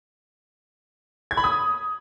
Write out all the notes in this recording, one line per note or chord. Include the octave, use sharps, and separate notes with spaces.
G#6
B5
D#6